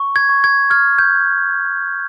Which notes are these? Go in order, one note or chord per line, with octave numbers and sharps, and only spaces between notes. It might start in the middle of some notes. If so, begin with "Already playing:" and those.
Already playing: C#6
G#6
C#6
G#6
F6 G#6
G6